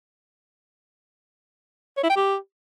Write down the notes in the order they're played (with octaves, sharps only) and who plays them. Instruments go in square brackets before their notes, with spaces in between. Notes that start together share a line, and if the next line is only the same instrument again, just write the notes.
[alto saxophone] C#5
E4
G5
G4